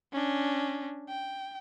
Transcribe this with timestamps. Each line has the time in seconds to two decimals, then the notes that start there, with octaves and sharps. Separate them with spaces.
0.13 C#4 D4
1.09 G5